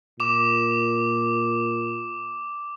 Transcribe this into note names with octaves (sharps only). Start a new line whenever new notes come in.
A#2 D6 E7